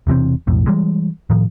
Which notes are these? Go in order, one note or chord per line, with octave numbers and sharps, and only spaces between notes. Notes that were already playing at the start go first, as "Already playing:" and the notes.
E1 C3 E3 C4
B1 F2 A2
E3 G3 G#3
A2 D#3 F3